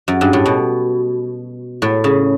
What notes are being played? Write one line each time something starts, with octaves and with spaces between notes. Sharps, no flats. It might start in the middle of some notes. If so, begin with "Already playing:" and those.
F#2
G2
A2
B2
A2
C#3